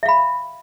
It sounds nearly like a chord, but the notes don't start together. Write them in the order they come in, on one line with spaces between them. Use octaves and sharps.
E5 F5 B5